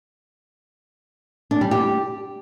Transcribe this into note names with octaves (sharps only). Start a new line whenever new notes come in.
D4
G3
G4